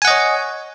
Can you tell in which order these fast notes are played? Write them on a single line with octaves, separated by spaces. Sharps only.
G#5 F#5 D#5 C#5